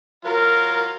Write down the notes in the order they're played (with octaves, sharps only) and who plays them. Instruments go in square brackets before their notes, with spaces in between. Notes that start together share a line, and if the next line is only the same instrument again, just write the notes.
[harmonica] F#3 F4 [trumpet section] A#4